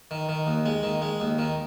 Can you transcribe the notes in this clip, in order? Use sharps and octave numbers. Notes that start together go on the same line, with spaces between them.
D#3
D#3
D#2
G#3
D#3
G#3
D#2
D#3